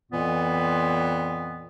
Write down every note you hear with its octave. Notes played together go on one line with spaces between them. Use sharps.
F2 A#2 E3 B3